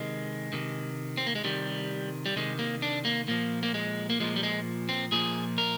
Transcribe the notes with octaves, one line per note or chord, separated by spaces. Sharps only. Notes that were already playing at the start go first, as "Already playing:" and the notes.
Already playing: C3 D#3 G#3
C3 D#3
C4
A#3
G#3
C3 D#3 G3
G3
C3 D#3 G#3
A#3
D4
A#3
A#2 F3 A#3
A#3
G#3
A#3
A#2 F3 G#3
G3
G#3
C4
A#2 F3 G#4
A#4